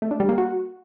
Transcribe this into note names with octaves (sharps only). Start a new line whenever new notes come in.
A3
D4
G3
A#3
F#4